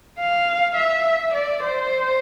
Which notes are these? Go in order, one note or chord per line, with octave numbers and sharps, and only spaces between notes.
F5
E5
D5
C5